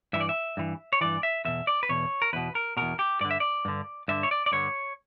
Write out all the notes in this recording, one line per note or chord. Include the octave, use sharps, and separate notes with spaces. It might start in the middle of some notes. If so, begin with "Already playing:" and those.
G2 E3 E5
D5
E5
G2 E3
C#5
G2 E3 D5
E5
E2 B2 E5
D5
B4
E2 B2 C#5
A#4
E2 B2 B4
A#4
E2 B2 A#4
G4
G2 D3 D5
E5
D5
G2 D3
G2 D3 E5
C#5
D5
D5
G2 D3 C#5